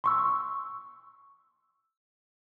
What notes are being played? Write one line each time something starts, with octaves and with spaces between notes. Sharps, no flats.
C6 C#6 E6